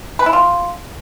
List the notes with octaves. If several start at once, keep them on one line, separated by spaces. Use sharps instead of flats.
B4
E4
F4